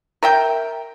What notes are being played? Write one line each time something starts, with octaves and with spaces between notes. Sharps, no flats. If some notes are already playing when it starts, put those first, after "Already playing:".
A#4 E5 G5